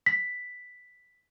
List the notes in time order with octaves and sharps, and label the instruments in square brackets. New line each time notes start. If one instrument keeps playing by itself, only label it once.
[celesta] B6